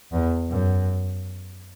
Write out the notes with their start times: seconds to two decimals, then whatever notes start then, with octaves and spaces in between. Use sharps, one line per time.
0.12 E2
0.50 F#2